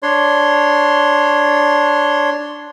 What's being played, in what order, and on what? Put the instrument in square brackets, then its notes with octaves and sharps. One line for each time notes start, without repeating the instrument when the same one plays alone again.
[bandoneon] D4 C#5 C6